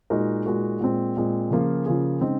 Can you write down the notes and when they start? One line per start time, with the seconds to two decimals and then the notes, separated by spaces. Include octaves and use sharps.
0.10 A#2 G#3 D#4 F#4 A#4
0.46 A#2 G#3 D#4 F#4 A#4
0.80 A#2 G#3 C4
1.17 A#2 G#3 C4
1.50 C#3 F3 A#3 F4 G#4
1.86 C#3 F3 A#3 F4 G#4
2.21 C#3 G#3 C4 D#4